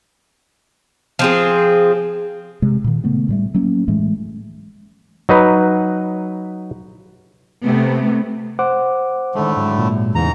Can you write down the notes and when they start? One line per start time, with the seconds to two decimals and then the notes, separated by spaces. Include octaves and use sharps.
1.19 F3 C4 G#4
2.62 C3 G#3
2.84 A#2 D#3
3.04 C#3 A3 B3
3.29 A2 G3 A3
3.54 F#3 A#3 C#4
3.88 A2 E3 G#3 A3
5.29 F#3 D#4 B4
7.63 C3 A3 B3
8.59 C5 F#5 D6
9.35 A2 D3 D#3 G#3 A3
9.56 G#2 F#3 G#3
9.79 A#2
10.15 E2 G#2 C#3 E3 A3 A#5